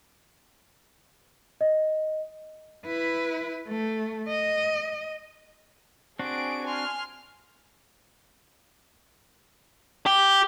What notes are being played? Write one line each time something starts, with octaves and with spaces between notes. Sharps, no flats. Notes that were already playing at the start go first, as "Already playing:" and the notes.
D#5
E4 B4
A3
D#5
C4 D4 F#4 G#4 D7
G#5 C6 F6
G4